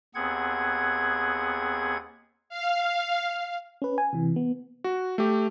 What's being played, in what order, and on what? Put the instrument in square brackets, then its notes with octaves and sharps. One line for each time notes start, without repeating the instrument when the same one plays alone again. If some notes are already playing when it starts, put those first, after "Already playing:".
[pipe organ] D#2 B3 C4 G#4 F#5 G#6
[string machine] F5
[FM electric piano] C#4 B4
G#5
C3 E3
B3
[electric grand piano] F#4
A3 G4